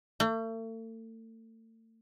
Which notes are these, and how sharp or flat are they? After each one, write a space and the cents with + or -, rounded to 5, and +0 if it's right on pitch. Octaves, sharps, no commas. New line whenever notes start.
A3 +40